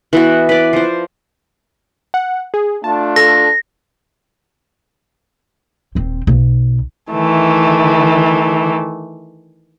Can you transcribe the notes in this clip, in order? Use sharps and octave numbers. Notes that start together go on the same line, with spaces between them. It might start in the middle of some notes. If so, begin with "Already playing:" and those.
E3 B3 F#4
B4 D5
F3 C5
F#5
G#4
A3 D4 F4 A5
A4 A#6
D#1 C4
B1
D#3 E3 A3